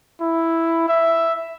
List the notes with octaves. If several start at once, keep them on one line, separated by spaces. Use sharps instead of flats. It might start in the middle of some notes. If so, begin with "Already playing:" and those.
E4
E5